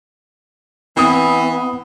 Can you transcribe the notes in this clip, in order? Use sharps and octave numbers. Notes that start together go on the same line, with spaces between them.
E3 B3 C4 D#6